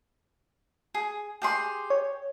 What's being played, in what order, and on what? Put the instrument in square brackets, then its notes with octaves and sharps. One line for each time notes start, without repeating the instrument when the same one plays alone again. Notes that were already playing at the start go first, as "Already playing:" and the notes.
[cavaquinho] G#4
G4 G#4 C6
[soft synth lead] C#5